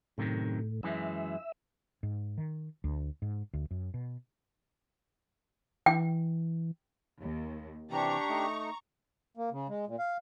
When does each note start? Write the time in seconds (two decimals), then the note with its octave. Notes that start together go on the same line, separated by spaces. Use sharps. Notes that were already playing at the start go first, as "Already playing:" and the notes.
0.18 F#2 A2 C3 D#3
0.83 F#2 E3 G#3 E5
2.03 G#2
2.38 D#3
2.84 D2
3.22 G#2
3.53 D2
3.71 F#2
3.94 B2
5.86 E3 G5
7.20 D#2
7.91 C3 E3 D4 G4 A#5 C#6
8.29 A3 D#4
9.37 A#3
9.52 C#3
9.69 G#3
9.87 A#2
9.99 F5